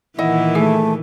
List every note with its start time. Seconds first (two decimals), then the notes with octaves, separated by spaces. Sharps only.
0.19 A#2 D#3 E3 E4 D#5 F#5
0.55 A3 G#4